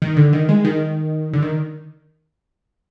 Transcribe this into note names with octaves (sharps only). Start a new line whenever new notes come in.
D#3
D3
D#3
G#3
D#3
D3
D#3